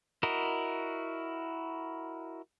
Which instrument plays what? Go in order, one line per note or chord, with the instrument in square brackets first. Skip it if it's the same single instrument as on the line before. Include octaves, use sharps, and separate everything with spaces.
[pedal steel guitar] E4 F#4 A#4 D#5